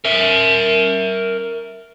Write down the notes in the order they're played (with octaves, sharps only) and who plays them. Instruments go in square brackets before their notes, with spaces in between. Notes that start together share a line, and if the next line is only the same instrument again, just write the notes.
[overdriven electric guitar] A#4 E5